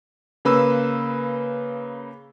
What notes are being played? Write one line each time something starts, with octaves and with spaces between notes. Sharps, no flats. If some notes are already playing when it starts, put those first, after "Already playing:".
C#3 A#3 B4 B5 E6